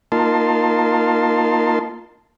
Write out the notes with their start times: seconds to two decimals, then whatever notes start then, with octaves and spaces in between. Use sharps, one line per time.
0.12 A#3 D#4 F4 A#4 A5 C6